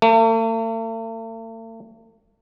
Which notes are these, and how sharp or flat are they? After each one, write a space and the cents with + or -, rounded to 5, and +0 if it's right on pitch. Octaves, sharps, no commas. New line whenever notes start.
A3 +45